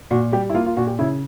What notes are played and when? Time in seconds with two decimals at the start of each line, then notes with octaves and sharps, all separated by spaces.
0.11 A#2 F#4
0.32 G3 G4
0.50 E4
0.54 A#3 F4
0.66 F4
0.77 A#2 F#4
0.87 G4
0.99 C#3 E4